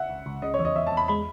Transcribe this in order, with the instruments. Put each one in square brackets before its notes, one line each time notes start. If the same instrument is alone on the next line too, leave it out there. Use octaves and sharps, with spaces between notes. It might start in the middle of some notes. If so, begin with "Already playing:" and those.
Already playing: [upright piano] E5 F#5
[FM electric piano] C#2
C#2
[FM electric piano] C#3 [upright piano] D#5
[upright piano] C#5
[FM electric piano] E2
[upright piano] D#5
[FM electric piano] E2 [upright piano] E5
[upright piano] A5
[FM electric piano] E2
[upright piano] B5
[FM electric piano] G#3 [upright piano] B5